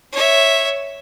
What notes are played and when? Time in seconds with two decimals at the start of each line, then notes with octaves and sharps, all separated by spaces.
0.12 C#5 E5